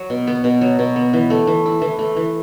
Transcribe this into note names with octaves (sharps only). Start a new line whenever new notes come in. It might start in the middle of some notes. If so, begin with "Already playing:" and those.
Already playing: F#3
B2
B3
B2
F#3
B2
B3
E3
A3
E3
E4
E3
A3
E3